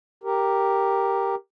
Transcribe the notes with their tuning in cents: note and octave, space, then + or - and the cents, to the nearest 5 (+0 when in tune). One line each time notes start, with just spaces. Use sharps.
G4 +0 A#4 +0